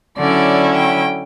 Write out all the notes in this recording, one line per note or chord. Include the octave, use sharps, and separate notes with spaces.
D3 F#3 C#4 E4 D5
G5